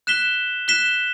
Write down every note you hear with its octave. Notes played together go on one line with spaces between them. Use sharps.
F#6 B6 E7 G7
F#6 B6 E7 G7